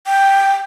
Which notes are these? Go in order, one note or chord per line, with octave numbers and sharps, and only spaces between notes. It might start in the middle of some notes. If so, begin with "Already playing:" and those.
G5